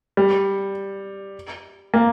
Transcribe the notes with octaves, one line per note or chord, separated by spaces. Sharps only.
G3
A#3